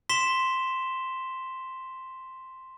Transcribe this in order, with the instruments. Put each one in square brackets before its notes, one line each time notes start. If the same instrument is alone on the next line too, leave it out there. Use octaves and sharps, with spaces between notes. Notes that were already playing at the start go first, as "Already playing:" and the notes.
[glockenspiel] C6 B6 E7 G7